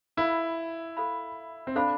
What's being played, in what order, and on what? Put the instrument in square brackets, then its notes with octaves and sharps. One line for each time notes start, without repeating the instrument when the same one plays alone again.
[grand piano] E4 [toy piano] A4 C5 F5 B5
[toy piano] A4 C5 F5 B5
[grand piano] C4
[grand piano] D4 [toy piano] A4 C5 F5 B5